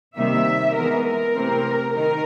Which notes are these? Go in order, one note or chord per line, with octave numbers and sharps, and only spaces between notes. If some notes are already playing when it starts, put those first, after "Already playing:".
C3 D#3 G3 A#3 E5
E3 G#3 B3 A#4
A#4
C3 E3 A3 C4
D#3 A#4